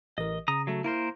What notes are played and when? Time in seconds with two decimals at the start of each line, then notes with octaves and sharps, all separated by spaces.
0.18 A1 E3 A#4 D#5
0.48 C#3 A#5 D#6
0.67 F#3 A3
0.84 A#3 E4 A#4 C5